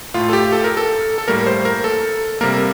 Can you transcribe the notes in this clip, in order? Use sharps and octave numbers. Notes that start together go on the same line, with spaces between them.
A2 A3 F4
A4
G4
A4
A#4
A4
A4
A2 G3 A#3 A#4
C5
A#4
A4
C3 G3 A#3 A#4